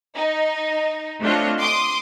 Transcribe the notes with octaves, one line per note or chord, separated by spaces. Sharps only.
D#4
A3 C4 D4 F4 C#5 D#5
C6 D6 D#6